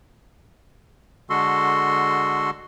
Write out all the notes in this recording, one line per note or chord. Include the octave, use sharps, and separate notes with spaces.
D3 G#3 F#4 A4 C6